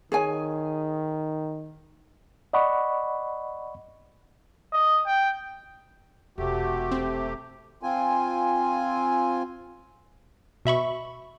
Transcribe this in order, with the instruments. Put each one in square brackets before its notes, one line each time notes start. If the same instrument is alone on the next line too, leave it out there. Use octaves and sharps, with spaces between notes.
[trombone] D#3 [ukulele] G#4 C#5 G#5
[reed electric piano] D5 D#5 F#5 B5 C#6
[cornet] D#5
G5
[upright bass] E1 [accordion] C3 A3 G4 [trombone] F#4
[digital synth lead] C4
[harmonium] C4 F4 G#5
[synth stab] B2 E5 B5 C#6